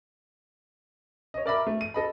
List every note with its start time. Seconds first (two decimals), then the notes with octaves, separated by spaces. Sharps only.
1.34 C#5 D#5
1.46 A#4 D5 E5 B5
1.67 A3
1.81 D#7
1.94 A4 D#5 B5